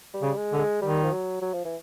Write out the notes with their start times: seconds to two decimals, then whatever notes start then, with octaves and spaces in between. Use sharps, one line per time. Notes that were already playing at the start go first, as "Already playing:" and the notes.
0.14 G3
0.22 C#3
0.37 G#3
0.52 D3
0.59 G#3
0.82 D#3 G3
1.03 F3
1.12 F#3
1.42 F#3
1.54 F3
1.65 E3